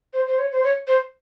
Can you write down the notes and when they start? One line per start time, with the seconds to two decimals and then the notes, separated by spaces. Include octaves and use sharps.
0.13 C5
0.27 C5
0.39 C#5
0.52 C5
0.63 C#5
0.87 C5